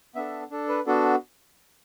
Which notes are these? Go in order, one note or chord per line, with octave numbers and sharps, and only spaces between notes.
B3 D4 A4 E5
D4 A4
B4
B3 D4 F#4 A4